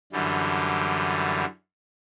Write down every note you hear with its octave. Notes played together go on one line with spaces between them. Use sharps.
F#2 D3 E3 G3